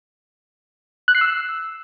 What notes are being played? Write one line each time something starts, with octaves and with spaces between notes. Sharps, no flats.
F#6
C7
E6